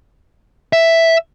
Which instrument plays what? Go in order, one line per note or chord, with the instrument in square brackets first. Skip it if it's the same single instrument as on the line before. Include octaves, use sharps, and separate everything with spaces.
[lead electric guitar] E5